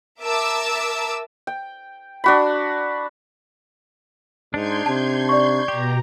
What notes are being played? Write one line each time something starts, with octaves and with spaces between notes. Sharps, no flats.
A#4 E5 A5 D6 E6
G5
D4 F#4 B5
G#2 D4 D#4 C6 G6 G#6
C3 A5
D5 C#6
B2 G4 A#5